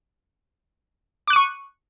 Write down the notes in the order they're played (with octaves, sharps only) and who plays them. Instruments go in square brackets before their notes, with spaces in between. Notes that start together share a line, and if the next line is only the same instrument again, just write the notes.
[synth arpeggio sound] D6
F#6
D#7
C#6